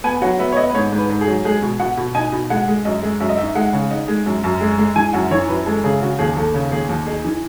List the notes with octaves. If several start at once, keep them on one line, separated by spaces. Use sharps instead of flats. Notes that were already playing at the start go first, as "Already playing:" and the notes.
B3 G#5
F#3 F#5
B3 E5
C#5
B3 D#5
B4
G#2 C#5
G#2
B4
G#2
G#4
F#3
G#3 G#4
B2
B2 F#5
B2
D#4 G#5
B2
G#3 F#5
G#3
F#2 D#5
G#3
F#2 E5
D#5
D#4 E5
G#3 F#5
C#3
D#4
G#3
F#2
F#2
G#3
G#3
E3 G#5
F#2 F#5
E3 C#5
F#2 B4
G#3 A4
C#3 G#4
C#3 F#4
D#2 G#4
D#2 A4
C#3
D#2 G#4
D#2
D#4 G#4
E3